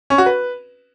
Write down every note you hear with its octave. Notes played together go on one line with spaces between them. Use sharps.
C#4
F#4
B4